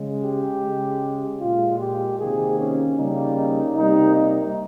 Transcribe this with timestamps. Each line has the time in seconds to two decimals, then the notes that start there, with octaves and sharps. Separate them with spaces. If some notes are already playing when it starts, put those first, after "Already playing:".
Already playing: C#3 G#3
0.23 G4
0.62 C#3 G#3
1.40 A#2 G#3 F4
1.79 G4
2.19 C3 D#3 A#3 G#4
2.58 C#4
2.97 C#3 G3 A#3 D#4
3.36 D#4
3.76 C3 G3 A#3 D#4
4.15 D#4